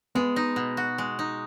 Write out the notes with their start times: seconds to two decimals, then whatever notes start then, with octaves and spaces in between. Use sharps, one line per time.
0.15 G#3 B3
0.36 D#4
0.56 B2
0.77 F#4
0.98 G#3
1.19 D#4